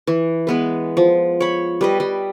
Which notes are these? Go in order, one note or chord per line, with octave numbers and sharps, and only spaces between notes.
E3
G#3 B3 B4
F3
C#5 B5
G3 B4 D#5
G3